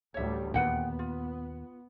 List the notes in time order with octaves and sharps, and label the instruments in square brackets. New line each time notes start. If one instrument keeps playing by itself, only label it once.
[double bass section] A1 D2 G3 [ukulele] C#5 E5
[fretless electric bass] D#2 A#2 [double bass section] B3 [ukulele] B4 F#5 G5
[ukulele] F4